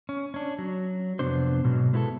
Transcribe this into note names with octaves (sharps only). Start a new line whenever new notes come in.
C#4
C#4 D4
F#3
F2 G#2 C3 B3 D4 C5
G#2 B2 F#3
G#3 B3 E4 F#4 G#4 A4